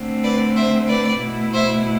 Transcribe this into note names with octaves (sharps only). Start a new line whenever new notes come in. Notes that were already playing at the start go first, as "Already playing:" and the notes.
Already playing: D3 A3 C4
B4 D5
C5 E5
B4 D5
B2 A3 E4
C5 E5